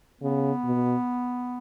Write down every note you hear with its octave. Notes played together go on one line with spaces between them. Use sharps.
C#3 B3
B2